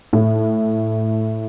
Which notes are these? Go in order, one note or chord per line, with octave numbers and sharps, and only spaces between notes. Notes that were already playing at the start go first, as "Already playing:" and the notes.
A2